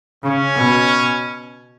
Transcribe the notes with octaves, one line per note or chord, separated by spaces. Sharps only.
C#3 C#4
B2